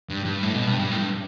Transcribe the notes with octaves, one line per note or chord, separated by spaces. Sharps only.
G2
G2
A2
B2
G2
G2
A2
G2